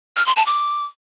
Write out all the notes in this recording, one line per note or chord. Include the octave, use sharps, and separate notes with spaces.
F6
C6
A5
D6